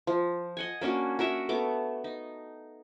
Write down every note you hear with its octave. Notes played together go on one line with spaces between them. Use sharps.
F3
D#5 F#5 G#5
A#3 C#4 D4 F#4
F#4 A#4 E5 F#5
A3 B3 D6
D#4